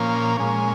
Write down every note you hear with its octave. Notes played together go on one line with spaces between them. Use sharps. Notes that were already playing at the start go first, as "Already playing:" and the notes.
Already playing: A#2 F3 A#3 C#4
A#2 G#3 C#4